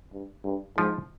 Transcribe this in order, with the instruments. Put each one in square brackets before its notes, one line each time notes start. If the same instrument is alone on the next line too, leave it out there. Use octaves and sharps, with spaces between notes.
[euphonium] G2
G2
[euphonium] G#2 [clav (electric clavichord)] F3